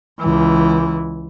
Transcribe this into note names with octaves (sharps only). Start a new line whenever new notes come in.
C#2 E3